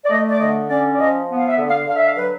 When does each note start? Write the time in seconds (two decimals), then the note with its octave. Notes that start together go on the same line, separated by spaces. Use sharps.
0.05 D5
0.10 A3 D#5
0.29 D5
0.40 D3 D#5
0.69 C#4 D5
0.94 D5
0.99 F3 D#5
1.28 B3
1.37 F5
1.48 E5
1.58 D3
1.68 F5
1.88 D3 F5
1.96 E5
2.06 F5
2.17 F#3 B4